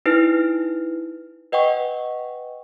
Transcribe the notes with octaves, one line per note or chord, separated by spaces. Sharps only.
D#4 E4 B4 F6
B4 D#5 F#5 G5 C#6